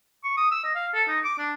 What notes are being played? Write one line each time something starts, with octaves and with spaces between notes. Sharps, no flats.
C#6
D#6
E6
D#5
F5
A4
D#4
D6
D4